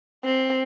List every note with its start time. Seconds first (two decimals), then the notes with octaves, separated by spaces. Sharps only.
0.25 C4